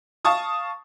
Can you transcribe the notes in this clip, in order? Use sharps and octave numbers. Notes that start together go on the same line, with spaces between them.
F5 A5 C#6 D#6